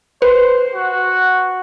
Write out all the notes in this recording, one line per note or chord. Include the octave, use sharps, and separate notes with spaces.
B4 C5
F#4